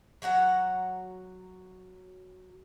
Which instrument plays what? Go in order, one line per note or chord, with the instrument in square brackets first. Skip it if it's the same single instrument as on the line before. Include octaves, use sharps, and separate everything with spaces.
[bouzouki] F#3 F#4 F#5 A#5